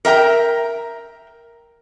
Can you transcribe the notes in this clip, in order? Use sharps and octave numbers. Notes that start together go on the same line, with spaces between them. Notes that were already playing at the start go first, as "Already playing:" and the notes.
A#4 E5 G5 A#5